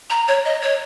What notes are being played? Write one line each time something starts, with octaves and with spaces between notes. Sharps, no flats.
A#5
C#5
D#5
C#5